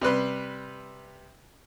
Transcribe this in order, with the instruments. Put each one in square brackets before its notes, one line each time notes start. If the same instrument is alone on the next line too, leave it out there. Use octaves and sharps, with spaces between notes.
[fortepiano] C3 G3 B4 C6